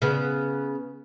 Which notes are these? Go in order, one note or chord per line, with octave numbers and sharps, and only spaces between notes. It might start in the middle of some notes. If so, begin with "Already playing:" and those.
C#3 B3